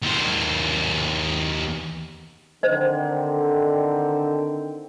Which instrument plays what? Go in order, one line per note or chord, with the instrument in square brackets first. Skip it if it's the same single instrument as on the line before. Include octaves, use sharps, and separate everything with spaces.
[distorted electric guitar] D#2 C5
[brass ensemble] D3 D#3 C4 [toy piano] C5 D#5